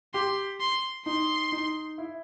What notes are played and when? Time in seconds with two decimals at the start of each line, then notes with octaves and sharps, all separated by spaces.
0.14 G4 C6
0.60 C6
1.06 D#4 C6
1.52 D#4
1.98 E4